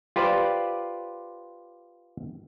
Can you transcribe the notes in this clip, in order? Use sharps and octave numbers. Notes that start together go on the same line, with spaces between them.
F4 G4 B4 C5 D5 F5